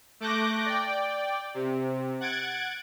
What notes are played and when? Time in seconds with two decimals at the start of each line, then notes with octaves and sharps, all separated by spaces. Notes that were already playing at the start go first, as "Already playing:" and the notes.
0.20 A3 D6 F#6 G6 A#6
0.66 D5 G5
1.54 C3
2.20 F#5 F#6 G#6 A6 D7